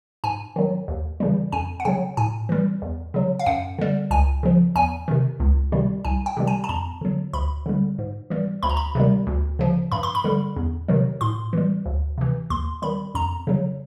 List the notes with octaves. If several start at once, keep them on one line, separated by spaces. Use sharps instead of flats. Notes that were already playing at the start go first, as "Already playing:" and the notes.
G#2 G#5
D#3 F#3
D#2
C#3 E3 G3
F2 G#5
F#5
C#3 F#3 G5
A2 G#5
E3 G3
E2
C#3 F#3
F5
F#2 F#5
D3 G3
C#2 G#5
C#3 F3
E2 G#5
C3 D#3
C#2
C3 D#3 G3
C2 G#5
G5
C3 D#3 G3
G#5
A5
F2 A#5
D3 F#3
D2 B5
D3 G3
G#2
E3 G3
D2 B5
A#5
B5
C3 D#3 G3
D2
C#3 F3
G2 B5
C6
B5
D3 G3
E2
C3 D#3 F#3
A2 C6
E3 G3
D2
C3 E3
D#2 C6
D#3 G3 B5
F2 A#5
C#3 F#3